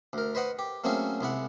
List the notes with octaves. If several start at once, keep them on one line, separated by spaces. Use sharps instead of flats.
D2 A#4
B4 C5 D#5 F#5 D#6
G4
F#3 A3 A#3 C4 C#4 G#4
C2 G#3 E4 F#5